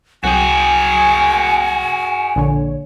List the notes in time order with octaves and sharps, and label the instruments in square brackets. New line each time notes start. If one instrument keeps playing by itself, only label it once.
[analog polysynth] C2 F#3 G5 [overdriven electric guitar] F#4 G#4 [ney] G#5
[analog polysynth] A#1 D3 C#5